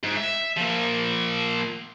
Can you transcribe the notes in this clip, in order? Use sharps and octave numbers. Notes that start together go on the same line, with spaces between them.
G#2
E5
F3 A#3